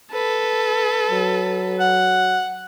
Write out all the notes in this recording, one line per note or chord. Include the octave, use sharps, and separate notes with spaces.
A4 B4
F#3
F#5